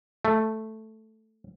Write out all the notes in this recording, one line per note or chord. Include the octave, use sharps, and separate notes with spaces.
A3